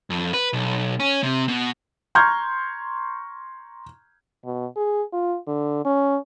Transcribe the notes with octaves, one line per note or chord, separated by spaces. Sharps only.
F2
B4
B1
C#4
C3
B2
A#5 C6 C#6 F6 G6 G#6
B2
G#4
F4
D3
C#4